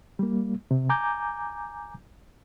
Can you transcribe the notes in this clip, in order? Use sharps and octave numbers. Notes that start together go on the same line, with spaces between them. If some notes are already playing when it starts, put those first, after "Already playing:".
G3 A#3
C3
G#5 A#5 D6 G6